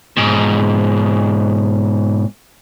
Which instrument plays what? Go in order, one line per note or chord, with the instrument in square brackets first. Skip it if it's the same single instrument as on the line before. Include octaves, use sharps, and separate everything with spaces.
[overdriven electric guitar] G#2 B2